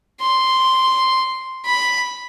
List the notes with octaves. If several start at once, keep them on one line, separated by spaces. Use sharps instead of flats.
C6
B5